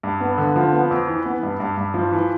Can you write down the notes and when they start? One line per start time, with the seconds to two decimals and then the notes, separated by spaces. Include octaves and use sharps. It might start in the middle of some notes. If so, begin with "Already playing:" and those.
0.03 G2
0.20 B3
0.38 D3
0.56 F3
0.73 B3
0.91 F2
1.08 E3
1.25 B3
1.43 G2
1.60 G2
1.77 G2
1.94 F3
2.12 E3